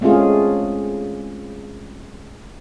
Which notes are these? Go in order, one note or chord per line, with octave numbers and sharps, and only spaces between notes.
G#3 A3 C4 C#4 F4 G#4